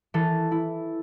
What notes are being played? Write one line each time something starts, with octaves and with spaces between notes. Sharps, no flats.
E3 A4
E4